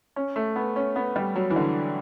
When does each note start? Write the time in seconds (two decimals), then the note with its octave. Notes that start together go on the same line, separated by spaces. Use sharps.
0.16 C#4
0.36 A3
0.56 B3
0.76 C#4
0.96 B3
1.16 G3
1.35 F#3
1.50 E3
1.56 D3